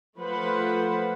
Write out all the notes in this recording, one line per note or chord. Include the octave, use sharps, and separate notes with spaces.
F3 A3 B4 C5 F#5